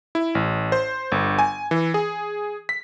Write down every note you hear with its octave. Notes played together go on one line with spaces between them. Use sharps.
E4
A1
C5
G1
G#5
E3
G#4
B6